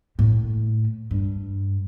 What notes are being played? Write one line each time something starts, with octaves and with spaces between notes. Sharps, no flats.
A2
G2